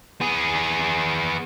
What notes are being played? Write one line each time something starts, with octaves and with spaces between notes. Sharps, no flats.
B3 G#4